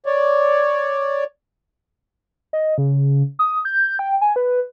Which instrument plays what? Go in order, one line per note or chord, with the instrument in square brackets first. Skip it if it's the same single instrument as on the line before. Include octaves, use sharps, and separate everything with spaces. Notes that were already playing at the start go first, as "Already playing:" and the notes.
[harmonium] C#5 D5
[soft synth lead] D#5
C#3
D#6
G6
G5
G#5
B4